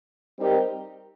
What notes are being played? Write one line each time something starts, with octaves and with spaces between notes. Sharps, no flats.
G3 C4 D#4 G4 A#4